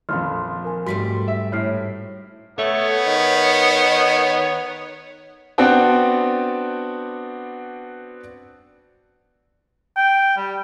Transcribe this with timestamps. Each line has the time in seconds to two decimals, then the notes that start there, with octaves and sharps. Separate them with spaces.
0.09 A#1 F2 F5 C6 F6
0.64 A#4 G#5
0.86 G#2 G3 A3 F#4 C6 B6
1.28 E5
1.52 A2 C#5 F6 C7
2.59 A3 B3 C#5
3.06 D#3
5.58 B3 C4 D4 F#4 G5 A5
9.97 G5
10.37 G3